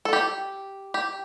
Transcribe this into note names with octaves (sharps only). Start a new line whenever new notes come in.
A4
G4
G4